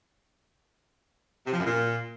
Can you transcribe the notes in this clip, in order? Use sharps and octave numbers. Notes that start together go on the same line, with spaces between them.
C3
F3
F#2
A#2